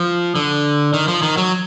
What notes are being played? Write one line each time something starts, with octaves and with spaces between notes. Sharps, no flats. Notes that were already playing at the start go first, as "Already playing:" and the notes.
Already playing: F3
D3
D#3
F3
D#3
F#3